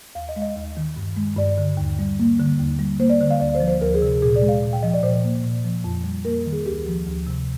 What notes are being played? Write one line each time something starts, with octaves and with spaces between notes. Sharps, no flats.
D#2 F5
D#5
G#3
D#5
D#2
D#3
G2
G#3
G2 D5
D3
D#2
G3
A#3
D3
D#2
G3
A#3 C5
D5
D3
F5
D2 D5
C5
F3
C5
D2 A#4
G#4
C3
A#2 G#4
D5
G#3
F5
A#2
G5
F3 D#5
D5
A#2 C5
A#3
A#2
F3
F2
G3
A#3 A#4
A#4
D#3
G#4
D2 G4
F3
D2
C3